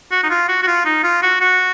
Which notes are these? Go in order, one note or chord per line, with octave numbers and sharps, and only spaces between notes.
F#4
D#4
F4
F#4
F#4
F4
D#4
F4
F#4
F#4